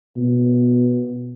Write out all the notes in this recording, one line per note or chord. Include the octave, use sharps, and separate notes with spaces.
B2